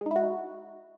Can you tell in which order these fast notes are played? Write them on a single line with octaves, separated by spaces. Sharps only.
G#3 D#4 E4 F#4